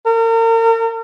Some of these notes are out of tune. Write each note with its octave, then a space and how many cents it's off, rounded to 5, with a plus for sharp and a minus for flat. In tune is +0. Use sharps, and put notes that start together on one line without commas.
A#4 -40